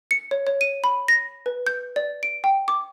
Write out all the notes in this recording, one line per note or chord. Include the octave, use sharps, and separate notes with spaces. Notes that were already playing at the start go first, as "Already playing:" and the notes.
C#7
C#5
C#5
D#7
B5
A#6
B4
G6
D5
D7
G5
D6